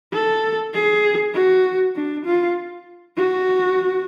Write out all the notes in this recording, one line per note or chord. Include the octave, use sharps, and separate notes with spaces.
A4
G#4
F#4
D4
F4
F#4